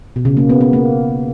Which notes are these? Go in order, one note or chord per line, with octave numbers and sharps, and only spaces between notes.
B2
C#3
A#3
B3
B3
A#3